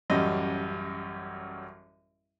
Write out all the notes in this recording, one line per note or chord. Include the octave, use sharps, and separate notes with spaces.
A1 F#2 G3 D#5